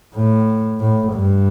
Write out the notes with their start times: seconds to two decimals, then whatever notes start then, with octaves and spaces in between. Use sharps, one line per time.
0.15 A2
0.81 A2
1.13 G2